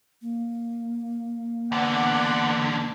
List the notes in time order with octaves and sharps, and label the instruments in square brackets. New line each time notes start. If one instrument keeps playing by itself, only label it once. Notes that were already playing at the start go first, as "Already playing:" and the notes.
[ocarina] A#3
[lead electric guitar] E2 D3 [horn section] B3 D5 F#5